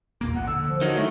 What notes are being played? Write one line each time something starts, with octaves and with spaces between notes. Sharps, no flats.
D#2 A#2 A#3
A1 F#5
D3 E6
F3
D#3 F#3
A2 A3